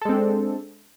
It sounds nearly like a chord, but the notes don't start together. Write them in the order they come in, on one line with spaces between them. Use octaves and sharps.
A4 G#3 C4 D4